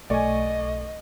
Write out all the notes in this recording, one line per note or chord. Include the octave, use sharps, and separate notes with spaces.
B1 A3 D5 D#5 G#5 C#6